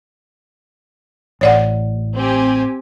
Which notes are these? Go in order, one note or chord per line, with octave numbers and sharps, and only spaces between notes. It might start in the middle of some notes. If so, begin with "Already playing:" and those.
A1 C#5 D5 F#5
C4 G4 G#5